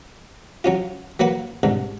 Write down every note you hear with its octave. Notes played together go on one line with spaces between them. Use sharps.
F#3 C#4 F4
F#3 A#3 B4 F#5
C2 G#2 D3